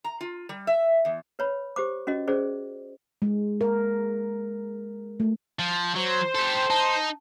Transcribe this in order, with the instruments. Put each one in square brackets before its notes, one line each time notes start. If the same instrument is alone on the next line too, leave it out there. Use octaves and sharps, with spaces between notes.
[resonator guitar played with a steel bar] A#5
F4
G3
E5
E2
[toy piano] B4 C#5 B5
G4 C5 D6
C#4 F#4 D#5
C#4 G#4 C5 D5
[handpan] G#3
A#4
A3
[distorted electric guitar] F3
[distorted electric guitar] F#3 [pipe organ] C5
[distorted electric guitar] G4 A4
[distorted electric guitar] D#4 [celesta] A5